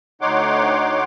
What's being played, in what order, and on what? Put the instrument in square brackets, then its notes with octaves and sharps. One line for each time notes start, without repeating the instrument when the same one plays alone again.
[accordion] D2 D#4 C#5 F#5 C6 D6